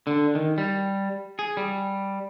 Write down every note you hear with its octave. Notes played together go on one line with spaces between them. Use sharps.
D3
D#3
G3
G#4
G3